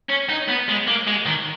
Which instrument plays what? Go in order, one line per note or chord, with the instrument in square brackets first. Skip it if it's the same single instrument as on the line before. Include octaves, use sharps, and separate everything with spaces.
[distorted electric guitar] C#4
D#4
B3
G#3
A#3
G#3
D#3